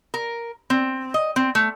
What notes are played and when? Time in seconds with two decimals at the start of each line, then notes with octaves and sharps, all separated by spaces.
0.14 A#4
0.70 C4
1.14 D#5
1.36 C4
1.55 A3